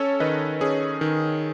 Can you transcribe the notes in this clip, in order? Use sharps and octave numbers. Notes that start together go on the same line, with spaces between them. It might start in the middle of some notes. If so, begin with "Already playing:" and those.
Already playing: C#4 A4 C#5
D#3 B4 D#5
C#4 G#4
D#3